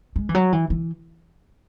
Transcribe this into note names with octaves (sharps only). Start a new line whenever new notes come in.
G#3
E3
F#3
E3
E3